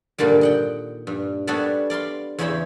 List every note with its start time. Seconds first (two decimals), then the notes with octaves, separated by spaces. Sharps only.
0.18 G2 A#2 D3 D#3 G3
0.41 D#5 F#5 G5
1.07 G2
1.47 G3 B3 D4 A4 C#5 F#5
1.90 D5 F5 B5 C6
2.39 E2 C#3 E4 C5 C#5 B5